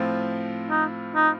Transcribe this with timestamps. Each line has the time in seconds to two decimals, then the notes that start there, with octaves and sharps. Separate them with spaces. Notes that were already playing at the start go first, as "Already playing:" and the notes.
Already playing: A2 F3 C4 F4
0.70 D#4
1.16 D#4